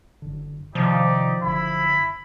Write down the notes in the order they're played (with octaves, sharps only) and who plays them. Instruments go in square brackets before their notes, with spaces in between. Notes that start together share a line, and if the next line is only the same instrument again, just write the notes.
[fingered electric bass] F#1 D3
[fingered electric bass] C3 D#3 [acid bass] F3 [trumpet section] D#4 G4 D5
[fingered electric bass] F#1 D3 [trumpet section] E4 B5